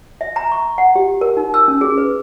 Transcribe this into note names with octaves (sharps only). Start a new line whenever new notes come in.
E5
A#5
C#6
F#5
G4
A#4
D#4
E6
C#4
G#4
B4